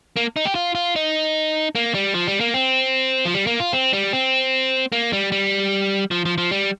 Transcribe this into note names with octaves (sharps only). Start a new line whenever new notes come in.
A#3
D#4
G4
F4
F4
D#4
A#3
G3
F3
G3
A#3
C4
F3
G3
A#3
F4
C4
G3
C4
A#3
G3
G3
F3
F3
F3
G3